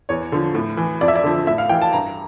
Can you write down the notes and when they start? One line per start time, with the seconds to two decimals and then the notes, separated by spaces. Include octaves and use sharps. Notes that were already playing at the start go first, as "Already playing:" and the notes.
0.09 E2 C#5
0.32 D3 F3
0.54 A2
0.77 E3
1.01 F2 D5
1.08 E5
1.16 D5
1.24 D3 F3
1.47 A2 E5
1.58 F5
1.69 E3 G5
1.82 A5
1.93 G2 A#5